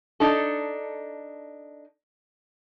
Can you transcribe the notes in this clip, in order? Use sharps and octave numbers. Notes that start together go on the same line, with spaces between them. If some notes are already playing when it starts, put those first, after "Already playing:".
D4 D#4 A4